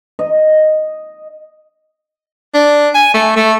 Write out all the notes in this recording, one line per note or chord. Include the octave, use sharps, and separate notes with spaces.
D#5
D4
G#5
A3
A3